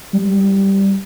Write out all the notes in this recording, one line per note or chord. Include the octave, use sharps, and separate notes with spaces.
G3